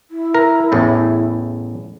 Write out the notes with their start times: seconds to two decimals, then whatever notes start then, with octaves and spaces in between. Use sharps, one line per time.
0.11 E4
0.34 A#4
0.72 A1 E2 A2